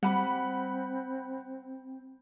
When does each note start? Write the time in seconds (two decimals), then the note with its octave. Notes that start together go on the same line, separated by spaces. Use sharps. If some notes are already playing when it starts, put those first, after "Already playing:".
0.03 G3 C4 F#5 B5